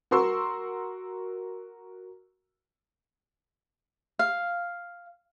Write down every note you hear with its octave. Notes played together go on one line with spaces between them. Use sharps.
F#4 A#4 C6 C#6 E6
F5